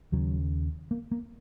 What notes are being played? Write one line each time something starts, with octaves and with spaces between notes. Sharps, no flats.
D#2 C#3 F#3
A#3
A#3